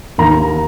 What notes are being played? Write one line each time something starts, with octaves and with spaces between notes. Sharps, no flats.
D#2 A#5